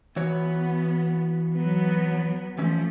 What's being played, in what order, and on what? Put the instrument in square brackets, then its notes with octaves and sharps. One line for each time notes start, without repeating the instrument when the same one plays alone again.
[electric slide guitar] E3 F#4 C#5 [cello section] B3
[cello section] F#3 B3
[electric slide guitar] E3 C#4 [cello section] F3 A3